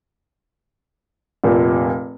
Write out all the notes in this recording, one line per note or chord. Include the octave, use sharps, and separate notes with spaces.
F1 A#2